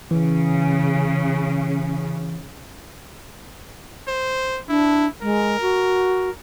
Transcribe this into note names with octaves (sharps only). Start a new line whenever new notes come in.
C#3 E3
C5
D4 E4
G#3 A#4
F#4